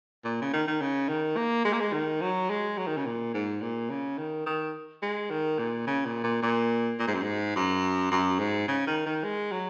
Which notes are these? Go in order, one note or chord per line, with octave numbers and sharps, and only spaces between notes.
A#2
C#3
D#3
D#3
C#3
D#3
A#3
G#3
A#3
G#3
D#3
F#3
G#3
F#3
D#3
C#3
A#2
G#2
A#2
C#3
D#3
D#3
G#3
D#3
A#2
C#3
A#2
A#2
A#2
A#2
G#2
F#2
G#2
F#2
F#2
G#2
C#3
D#3
D#3
G#3
F#3